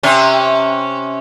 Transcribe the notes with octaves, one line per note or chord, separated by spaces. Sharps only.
C3 C#4